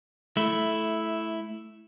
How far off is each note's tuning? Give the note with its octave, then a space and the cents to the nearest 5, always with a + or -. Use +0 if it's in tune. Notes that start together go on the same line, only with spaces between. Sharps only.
A3 -15 E4 +0